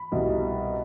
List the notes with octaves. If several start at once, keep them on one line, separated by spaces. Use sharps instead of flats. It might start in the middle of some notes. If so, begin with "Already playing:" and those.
Already playing: B5
C2 B2 G3